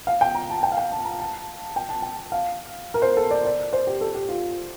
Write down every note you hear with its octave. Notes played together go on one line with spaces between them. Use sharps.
F5
G5
A#5
A5
G5
F5
G5
A5
A#5
A5
G5
A5
G5
F5
A#4
C5
A4
D5
D5
C5
G4
A4
G4
F4